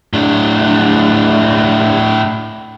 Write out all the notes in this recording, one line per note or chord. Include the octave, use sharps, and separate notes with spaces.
A2 D4